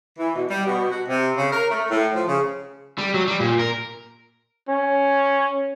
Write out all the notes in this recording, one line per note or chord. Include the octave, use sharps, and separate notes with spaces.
E3
B2
G3
B2
F#4
C3
C#3
A#4
A3
A2
F3
C#3
G3
F#3
G3
A#2
A#4
C#4